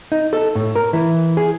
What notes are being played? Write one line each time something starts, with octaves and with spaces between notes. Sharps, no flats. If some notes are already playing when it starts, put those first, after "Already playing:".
D#4
A4
A2
A#4
E3
G#4